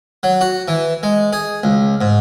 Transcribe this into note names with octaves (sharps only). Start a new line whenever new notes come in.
F#3
F#4
E3
G#3
G#4
C#2
G#2